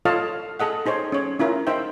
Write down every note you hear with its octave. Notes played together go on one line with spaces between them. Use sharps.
F4 A4 C#5 D#5 F5 A5
G#4 A4 D#5 F#5
D#4 G#4 C5 C#5
C#4 C#5
C#4 E4 F4 A#4
D#4 C5 E5 G5